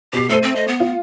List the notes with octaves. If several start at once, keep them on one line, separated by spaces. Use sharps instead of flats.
B2 G4 C7
A3 A4 C5 D#7
C4
D#5
B3
F4